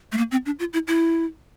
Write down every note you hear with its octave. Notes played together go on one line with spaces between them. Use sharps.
A3
A#3
C4
D4
F4
E4
E4